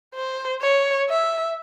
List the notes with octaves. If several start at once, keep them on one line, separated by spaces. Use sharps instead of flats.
C5
C#5
E5